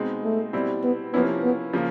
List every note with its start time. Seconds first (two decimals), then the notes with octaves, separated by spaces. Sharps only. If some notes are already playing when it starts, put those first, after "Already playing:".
Already playing: B2 G#3 C4 D#4
0.23 A3
0.53 B2 G3 C4 E4
0.83 B3
1.13 C3 F3 A#3 B3 C#4 E4
1.43 B3
1.73 C#3 F3 A#3